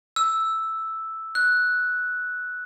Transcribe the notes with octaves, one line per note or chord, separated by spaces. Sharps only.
E6
F#6